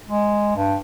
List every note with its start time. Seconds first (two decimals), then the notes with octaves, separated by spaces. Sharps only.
0.10 G#3
0.56 G2